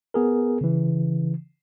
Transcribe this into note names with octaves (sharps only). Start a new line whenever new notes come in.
B3 G#4 A#4
C#3 E3